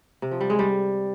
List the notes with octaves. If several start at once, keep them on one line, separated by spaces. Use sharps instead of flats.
C3
F3
G3
G#3
G3